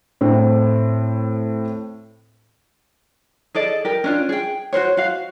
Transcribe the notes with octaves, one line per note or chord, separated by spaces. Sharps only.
A2 C4
G#4 A4 D5 D#5
G4 A#4
C#4 D4 F4
G#4 G5
F#4 A#4 C5 C#5
F#4 F5